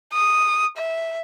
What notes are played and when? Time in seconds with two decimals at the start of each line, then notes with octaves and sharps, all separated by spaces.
0.13 D#6
0.77 E5